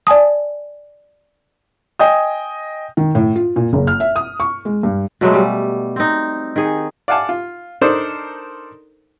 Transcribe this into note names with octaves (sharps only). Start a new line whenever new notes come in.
D5 G#5 A5 D#6
D#5 G5 G#5 D#6
D#3
A2
F4
A#2
F#1
F6
E5
D#6
C#6
G#3
G2
B2 F#3 G#3 A3
G3
C4 D#4
D#3 G#4
D5 F5 F#5 G#5 A5 D6
F4
D4 D#4 A4 A#4 C5 D5